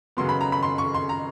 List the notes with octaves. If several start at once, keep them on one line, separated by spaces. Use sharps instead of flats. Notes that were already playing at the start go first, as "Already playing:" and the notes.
F#2 C#3 F#3 B3 C6
B5
A#5
B5
C6
C#6
C6
A#5